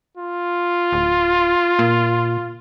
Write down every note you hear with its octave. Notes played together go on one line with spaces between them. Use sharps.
F4
D1
A#2